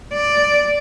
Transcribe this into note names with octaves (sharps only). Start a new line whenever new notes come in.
D5